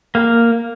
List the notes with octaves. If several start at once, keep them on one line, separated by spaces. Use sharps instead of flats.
A#3